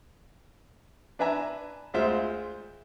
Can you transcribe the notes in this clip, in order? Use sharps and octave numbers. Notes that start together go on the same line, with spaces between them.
D4 B4 E5 G#5 A#5
D2 G#3 F4 C5 E5